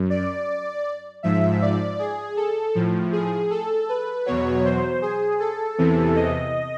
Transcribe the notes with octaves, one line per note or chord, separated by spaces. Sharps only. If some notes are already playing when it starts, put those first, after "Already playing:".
Already playing: F#2
D5
G#2 F3 E5
D5
G#4
A4
A2 F3
G#4
A4
B4
E2 B2 F#3 C#5
C5
G#4
A4
E2 C3 E3
D#5